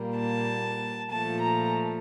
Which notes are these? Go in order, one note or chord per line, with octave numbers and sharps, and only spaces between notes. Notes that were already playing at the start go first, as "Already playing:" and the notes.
Already playing: A#2 G3 A#3
A5
A#2 F3 A3 A5
A#5